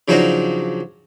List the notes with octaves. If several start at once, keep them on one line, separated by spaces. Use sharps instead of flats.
C#3 F3 F#3 D4 D#4 F#4